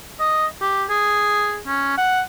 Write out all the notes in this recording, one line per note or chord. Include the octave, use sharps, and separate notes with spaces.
D#5
G4
G#4
C#4
F#5